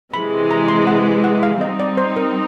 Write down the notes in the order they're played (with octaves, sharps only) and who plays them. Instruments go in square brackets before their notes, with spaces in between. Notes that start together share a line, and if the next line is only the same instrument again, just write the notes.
[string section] C3 E3 G#3 [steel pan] B5
[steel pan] A#5
C6
F#5
F#5
F5
[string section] G3 C4 D#4 [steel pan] D#5
[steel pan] D5
C5
A#4